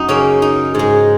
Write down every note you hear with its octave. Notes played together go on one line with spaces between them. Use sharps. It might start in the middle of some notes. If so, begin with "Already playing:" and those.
Already playing: F#2 D#4
C#3 A#3 C#4
D#4
G#2 G#3